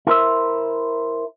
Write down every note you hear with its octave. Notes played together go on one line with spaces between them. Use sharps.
E4 A#4 C5 E5